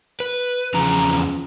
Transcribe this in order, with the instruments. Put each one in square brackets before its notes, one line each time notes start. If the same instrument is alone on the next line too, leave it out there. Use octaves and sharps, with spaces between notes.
[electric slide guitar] B4
[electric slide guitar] E2 F3 A#5 [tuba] C#3